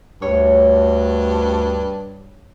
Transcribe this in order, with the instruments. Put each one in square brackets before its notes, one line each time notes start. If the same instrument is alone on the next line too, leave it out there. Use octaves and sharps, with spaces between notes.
[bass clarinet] D2 [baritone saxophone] G2 [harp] C#5